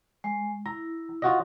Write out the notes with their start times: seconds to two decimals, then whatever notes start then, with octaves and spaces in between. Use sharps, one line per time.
0.24 G#3
0.66 E4 A#5
1.22 F4 F#4 D#5